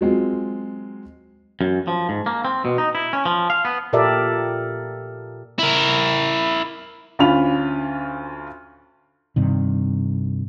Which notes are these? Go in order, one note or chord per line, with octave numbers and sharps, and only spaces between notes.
F#3 G#3 C4 F4
F#2
F3
G#2
A#3
C4
B2
D#4
E4
C#4
F3
F5
B3
A#2 G4 A4 A#4 D5 E5
E4 A#4
D2 C#4 F4 B5 F7
G2 C3 D#3